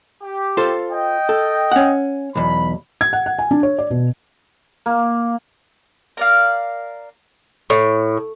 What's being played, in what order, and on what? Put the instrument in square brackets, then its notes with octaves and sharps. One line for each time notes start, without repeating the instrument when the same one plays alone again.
[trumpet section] G4
[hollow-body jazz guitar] F4 A4 C5
[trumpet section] D#5 G5
[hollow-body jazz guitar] A4
C#4 F#5
[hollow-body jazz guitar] B1 E2 [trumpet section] B5
[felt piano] G#6
F#5
F#5
G#5
D4
C#5
D5
B2
[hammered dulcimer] A#3
[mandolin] A#4 D5 F5
[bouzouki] A2